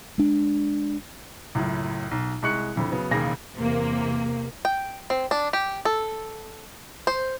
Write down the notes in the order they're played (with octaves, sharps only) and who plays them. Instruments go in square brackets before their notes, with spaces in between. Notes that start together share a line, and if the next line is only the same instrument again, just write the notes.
[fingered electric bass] G#3 D4
[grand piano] C#2 F#2 A2
B1
C2 G#3 C#6 F#6 C#7
F#1 F2 D3 B5
C#3 F#3 B3
E1 D#2 C#3 A#3 G#4 A#6
[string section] E2 C3 A#3
[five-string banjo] G5
C4
D4
G4
A4
C5